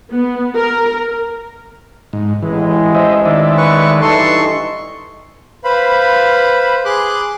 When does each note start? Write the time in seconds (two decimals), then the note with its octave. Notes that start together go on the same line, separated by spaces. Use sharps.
0.11 B3
0.55 A#4
2.13 G#2
2.43 A1 E3 G#3
2.95 C5 D#5 E5
3.25 D#3 D5 E5
3.57 B4 C#6
4.01 G2 E3 D#4 A4 C6 C#6
5.64 B4 C5 F5 B5
6.85 G#4 C6 D6 F#6